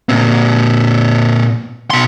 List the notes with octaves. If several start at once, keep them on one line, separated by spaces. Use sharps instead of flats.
A#2 C4
B2 C6